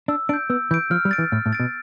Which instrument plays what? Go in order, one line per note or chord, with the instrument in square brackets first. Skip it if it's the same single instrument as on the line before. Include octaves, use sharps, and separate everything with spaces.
[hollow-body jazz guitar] D4 [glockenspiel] E6
[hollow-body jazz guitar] D4 [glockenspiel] D7
[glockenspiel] G6
[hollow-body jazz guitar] B3 [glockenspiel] E6
[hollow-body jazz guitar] E3 [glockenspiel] G6 D7
[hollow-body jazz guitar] F3 [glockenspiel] F6
[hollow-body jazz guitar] G3
[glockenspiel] A6 D7
[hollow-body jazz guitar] E3
[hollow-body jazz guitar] A2 [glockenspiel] F6
[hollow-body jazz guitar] A2
[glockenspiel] A6 D7
[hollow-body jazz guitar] B2